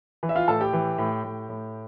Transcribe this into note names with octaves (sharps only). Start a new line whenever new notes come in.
E3
E5
F4 F5
A2 A4 A5
G4 G5
E3
A2
A2
A2